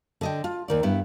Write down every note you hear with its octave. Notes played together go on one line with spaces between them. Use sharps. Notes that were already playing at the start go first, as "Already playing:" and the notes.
D3 D#5 G5
F4
D#2 D#3 D5
G2 B3 E4